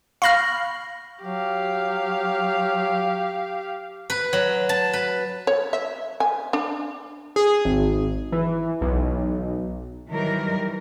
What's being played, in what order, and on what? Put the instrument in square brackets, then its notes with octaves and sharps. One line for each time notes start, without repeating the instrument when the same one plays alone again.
[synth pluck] F5 B5 F6 [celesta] C#6 A#6
[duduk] F#3 [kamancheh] G4 F5
[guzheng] B4
F#3
A5
B4
[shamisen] C#5
E5
G#5
D4
[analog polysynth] G#4
G#1
E3
B1
[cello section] D#3 E3 F#3 G3 A#4